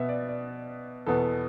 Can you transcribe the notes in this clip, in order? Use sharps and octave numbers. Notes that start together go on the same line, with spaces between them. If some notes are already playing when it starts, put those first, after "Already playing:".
Already playing: B2 B3 E5
D5
D5
E2 B2 B3 A4